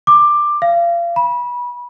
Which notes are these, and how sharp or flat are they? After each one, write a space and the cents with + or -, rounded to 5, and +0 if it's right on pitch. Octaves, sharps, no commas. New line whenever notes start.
D6 +15
F5 -30
B5 -25